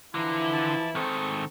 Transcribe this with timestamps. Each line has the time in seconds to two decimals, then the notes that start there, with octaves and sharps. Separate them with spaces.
0.15 D3 E3 F3 E4 A#5
0.53 A5 D6
0.95 G#2 D#3 C4 A4 C#6